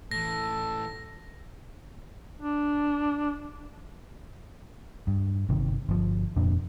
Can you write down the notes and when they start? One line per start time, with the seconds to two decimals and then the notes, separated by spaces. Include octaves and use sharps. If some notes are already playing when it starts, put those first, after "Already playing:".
0.11 A2 E3 A4 A#6
2.39 D4
5.07 G2
5.49 G1 C3 D#3
5.88 G1 F3
6.36 F1 F2 A#2 D4